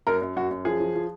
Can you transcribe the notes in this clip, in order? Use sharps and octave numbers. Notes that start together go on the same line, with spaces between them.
F#2 A#4
F#2
F#2 F#4
F#2
F3 G#4
F3
F3